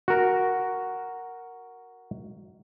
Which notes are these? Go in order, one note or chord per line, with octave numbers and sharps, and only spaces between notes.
F#4 A#4